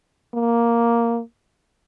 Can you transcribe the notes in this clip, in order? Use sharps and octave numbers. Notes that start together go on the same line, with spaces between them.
A#3